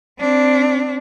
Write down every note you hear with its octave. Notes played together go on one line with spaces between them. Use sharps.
C4 D4